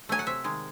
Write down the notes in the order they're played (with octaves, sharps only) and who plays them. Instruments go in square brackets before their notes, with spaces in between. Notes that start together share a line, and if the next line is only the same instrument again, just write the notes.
[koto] F#3 A3 G#5
F#5
C3 E5
D#3 G#3